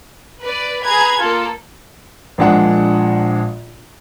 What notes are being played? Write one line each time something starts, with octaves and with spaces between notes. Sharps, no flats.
B4 D5
G#4 B4 A#5 G#6
A#3 F4 A4
A#1 A#2 G#3 D4 F#5